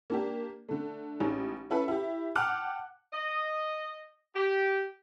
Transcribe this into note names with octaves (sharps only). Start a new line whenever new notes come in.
A#3 D4 G4
D3 A3
A1 G#3 C#4 D#4
C#4 E4 A4 B4
E4 G4
F#5 G5 A5 D6 F6 F#6
D#5
G4